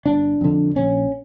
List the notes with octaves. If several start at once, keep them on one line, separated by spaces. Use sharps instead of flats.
G1 D4
F2 D3
A#1 C#4